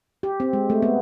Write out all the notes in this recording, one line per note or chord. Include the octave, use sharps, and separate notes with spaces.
G4
C4
G#3
A3
B3